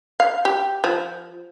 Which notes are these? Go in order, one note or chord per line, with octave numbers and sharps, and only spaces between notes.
F5
G4
F3